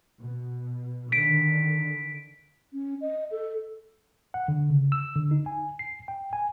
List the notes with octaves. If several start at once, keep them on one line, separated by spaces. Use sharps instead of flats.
B2
D3 D#3 B6 D7
C#4
D#5
A4
F#5
D3
C#3
E6
D3
D#4
G#5
C7
G5
G#5